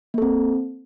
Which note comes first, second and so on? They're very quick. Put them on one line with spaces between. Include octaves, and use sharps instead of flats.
A#3 A4 C4